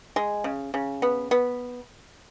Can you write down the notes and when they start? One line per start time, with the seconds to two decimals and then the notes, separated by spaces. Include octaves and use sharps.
0.16 G#3
0.44 C#3
0.74 C#3
1.02 B3
1.31 B3